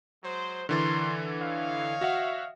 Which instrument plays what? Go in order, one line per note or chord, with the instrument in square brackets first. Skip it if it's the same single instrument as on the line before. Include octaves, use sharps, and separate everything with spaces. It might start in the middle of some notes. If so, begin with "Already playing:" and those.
[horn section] F#3 G#3 C5
[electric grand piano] D3 E3 A6 [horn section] A#4 C#5 C6
[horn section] C#5 D#5 F5
[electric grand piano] F#4 E5 F#5